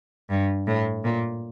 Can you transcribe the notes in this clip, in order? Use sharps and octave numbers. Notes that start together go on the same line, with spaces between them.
G2
A2
A#2